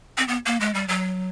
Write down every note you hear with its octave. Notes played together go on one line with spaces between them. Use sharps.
C4
B3
A#3
G#3
G3
F#3